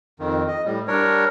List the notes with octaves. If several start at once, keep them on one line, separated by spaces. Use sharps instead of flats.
F2 D#3
D#5
A2 G3
G3 D4 A#4 C#5